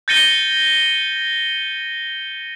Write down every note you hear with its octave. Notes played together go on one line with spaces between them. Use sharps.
G6 A6 A#6 C#7 D#7 G7